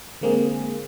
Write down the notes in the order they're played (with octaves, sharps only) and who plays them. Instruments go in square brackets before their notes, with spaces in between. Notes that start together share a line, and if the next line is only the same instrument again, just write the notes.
[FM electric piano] D3 G#3 A#3 C4 G#4